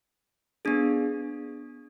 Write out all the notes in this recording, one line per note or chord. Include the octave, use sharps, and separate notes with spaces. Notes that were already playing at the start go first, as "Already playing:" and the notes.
B3 D4 G#4